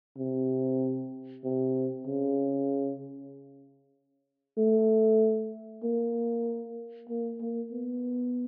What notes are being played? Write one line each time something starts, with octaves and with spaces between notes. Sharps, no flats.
C3
C3
C#3
A3
A#3
A#3
A#3
B3